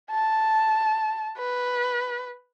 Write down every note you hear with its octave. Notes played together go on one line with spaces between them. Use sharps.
A5
B4